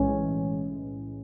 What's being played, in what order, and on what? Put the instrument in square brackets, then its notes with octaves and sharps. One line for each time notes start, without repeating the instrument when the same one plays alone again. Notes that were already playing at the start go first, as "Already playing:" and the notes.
Already playing: [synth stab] B1 A2 E3 G#3 [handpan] C#4